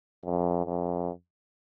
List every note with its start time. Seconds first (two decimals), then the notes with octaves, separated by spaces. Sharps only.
0.24 F2
0.66 F2